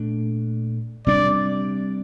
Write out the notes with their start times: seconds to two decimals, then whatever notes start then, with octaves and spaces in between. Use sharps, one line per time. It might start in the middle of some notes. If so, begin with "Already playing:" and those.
Already playing: A#2 A3 D4
1.07 C3 G3 D4 D5